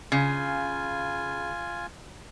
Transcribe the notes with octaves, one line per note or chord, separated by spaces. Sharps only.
C#3 F4 G#5